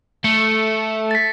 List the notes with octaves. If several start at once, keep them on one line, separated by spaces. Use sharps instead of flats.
A3 C#7
A6 B6